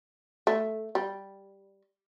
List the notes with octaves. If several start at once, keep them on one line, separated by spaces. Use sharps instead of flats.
A3
G3